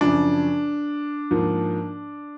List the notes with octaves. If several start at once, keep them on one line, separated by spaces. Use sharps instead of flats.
F#2 C#3 F3 D4
G#2 F3 A#3